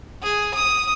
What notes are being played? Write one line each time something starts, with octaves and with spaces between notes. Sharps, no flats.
G#4
D#6